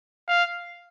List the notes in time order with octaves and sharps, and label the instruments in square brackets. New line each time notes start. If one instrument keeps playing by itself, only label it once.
[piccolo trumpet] F5